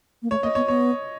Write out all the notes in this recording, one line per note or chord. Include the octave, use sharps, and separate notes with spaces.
A#3
A3 C#5
A#3 D#5
B3 C#5
B3 C#5